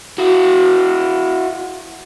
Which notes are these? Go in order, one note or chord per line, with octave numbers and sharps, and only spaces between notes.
E4 F#4